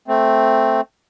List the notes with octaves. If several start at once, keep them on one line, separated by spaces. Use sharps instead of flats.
A3 C4